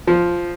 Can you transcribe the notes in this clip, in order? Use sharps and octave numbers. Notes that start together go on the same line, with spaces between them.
F3